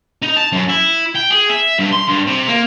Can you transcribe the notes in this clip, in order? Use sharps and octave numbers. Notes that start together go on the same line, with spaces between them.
D#4
A5
F#2
E4
G5
G#4
E5
G2
C6
G2
C3
A#3